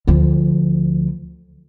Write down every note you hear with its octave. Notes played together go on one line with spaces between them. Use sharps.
D2 F3